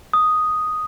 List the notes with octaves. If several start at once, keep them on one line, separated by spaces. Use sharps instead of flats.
D#6